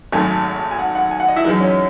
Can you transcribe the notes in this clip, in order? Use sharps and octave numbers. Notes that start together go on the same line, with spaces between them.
G#1 F#2 D#3 A3 G#5
G#5
F#5
F#5
G#5
F#5
D#5
E4
F#2 E3 G#3 D#4
C#4